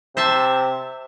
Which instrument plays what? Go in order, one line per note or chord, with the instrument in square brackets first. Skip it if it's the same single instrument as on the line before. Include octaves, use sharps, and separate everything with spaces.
[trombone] C3 [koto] C5 E5 A5